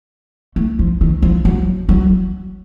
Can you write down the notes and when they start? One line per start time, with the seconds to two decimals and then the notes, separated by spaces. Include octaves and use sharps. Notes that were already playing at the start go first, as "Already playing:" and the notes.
0.56 A3
0.79 F3
1.01 D#3
1.22 F3
1.45 F#3
1.89 F#3